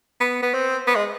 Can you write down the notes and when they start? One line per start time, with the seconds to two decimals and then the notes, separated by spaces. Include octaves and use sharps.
0.21 B3
0.42 B3
0.54 C4
0.87 B3
0.95 G#3